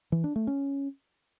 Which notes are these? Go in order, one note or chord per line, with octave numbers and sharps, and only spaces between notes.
E3
D4
A3
C#4